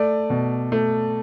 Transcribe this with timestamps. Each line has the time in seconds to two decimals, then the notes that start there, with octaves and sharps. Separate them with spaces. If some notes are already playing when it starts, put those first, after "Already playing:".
Already playing: A3 D5
0.30 B2
0.72 A3